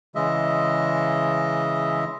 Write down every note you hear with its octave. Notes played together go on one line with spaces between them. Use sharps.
C#3 E3 G#3 D#5 E5